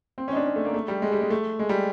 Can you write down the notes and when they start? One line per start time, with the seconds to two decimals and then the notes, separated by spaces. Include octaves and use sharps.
0.18 C4
0.28 C#4 D#4
0.37 D4
0.46 C#4
0.56 A3
0.65 A#3
0.74 A3
0.88 G3
1.02 G#3
1.12 G3
1.21 G#3
1.30 A3
1.59 G#3
1.69 G3